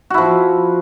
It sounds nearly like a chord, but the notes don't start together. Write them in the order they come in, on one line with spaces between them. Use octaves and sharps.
F#4 E4 F3